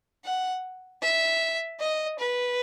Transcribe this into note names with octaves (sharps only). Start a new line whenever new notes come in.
F#5
E5
D#5
B4